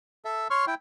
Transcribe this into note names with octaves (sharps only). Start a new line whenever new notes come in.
A4 E5
C#5 C6 C#6 F6
E4 G5